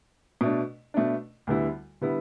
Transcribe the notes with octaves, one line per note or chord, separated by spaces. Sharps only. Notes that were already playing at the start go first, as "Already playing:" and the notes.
B2 A3 D4
B2 A3 D4
D2 D3 G3 B3 E4
D3 G3 B3 E4